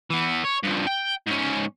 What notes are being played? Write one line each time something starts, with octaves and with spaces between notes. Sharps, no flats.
E3 B3
C#5
G2 F3
G5
G#2 C#4